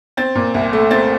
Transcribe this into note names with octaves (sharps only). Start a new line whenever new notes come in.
C4 A6
A#2
C2
A3
C4 A6